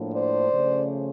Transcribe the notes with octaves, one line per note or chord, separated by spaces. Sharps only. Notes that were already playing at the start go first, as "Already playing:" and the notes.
Already playing: A2 F3 A#3 D4
C5 D5
C#3 F3 A3 C#4